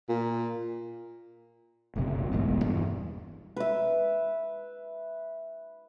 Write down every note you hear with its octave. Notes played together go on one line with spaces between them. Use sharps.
A#2
F#1 B1 F#2 C3
E1 A1 G#2 B2
E1 A#1 G2 E3
B4 E5